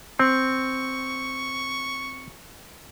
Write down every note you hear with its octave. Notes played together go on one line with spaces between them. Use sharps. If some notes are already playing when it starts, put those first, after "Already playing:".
C4 C#6